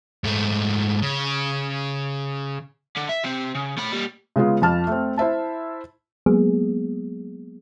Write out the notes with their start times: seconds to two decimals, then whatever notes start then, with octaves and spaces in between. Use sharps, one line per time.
0.24 G#2 A3
1.02 C#3
2.97 D3
3.09 E5
3.24 C3 C4
3.55 C#3
3.78 A3 B5
3.93 G3 A#3
4.36 C#3 G#3 B3 F4
4.62 F2 F4 A5 F6
4.87 A3 C4
5.18 E4 C5 E5 A5
6.26 F#3 G#3 A#3 B3 G#4